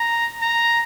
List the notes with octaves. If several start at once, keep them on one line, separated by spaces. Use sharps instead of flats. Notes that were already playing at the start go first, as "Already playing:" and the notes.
Already playing: A#5
A#5